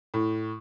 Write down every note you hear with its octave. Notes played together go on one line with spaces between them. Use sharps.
A2